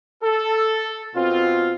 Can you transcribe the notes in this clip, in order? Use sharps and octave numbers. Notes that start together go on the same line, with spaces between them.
A4
B2 C4 F4